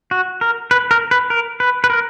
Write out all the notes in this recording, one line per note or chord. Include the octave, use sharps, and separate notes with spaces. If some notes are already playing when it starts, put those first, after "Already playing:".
F#4
A#4
B4
A#4
B4
A#4
B4
B4
A#4